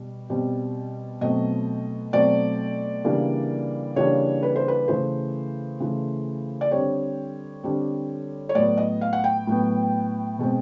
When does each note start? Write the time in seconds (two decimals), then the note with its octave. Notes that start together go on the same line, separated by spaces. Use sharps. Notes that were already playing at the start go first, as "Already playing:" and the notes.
Already playing: B2 G3
0.30 B2 G3 C4
1.21 B2 F#3 A3 C4 D#5
2.13 B2 F#3 A3 C4 D5
3.05 C#3 E3 G3 A#3 D4
3.96 C#3 E3 G3 A#3 D4 C#5
4.43 B4
4.56 C5
4.68 B4
4.88 C#3 E3 A3 C5
5.80 C#3 E3 A3
6.61 D5
6.71 D3 G3 C4 C#5
7.63 D3 G3 C4
8.49 C#5
8.55 A2 F#3 B3 D5
8.77 D#5
9.01 F5
9.13 F#5
9.24 G5
9.47 A2 F#3 B3
10.39 B2 G#3 C4